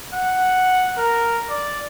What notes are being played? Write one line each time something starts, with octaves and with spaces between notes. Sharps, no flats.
F#5
A#4
D5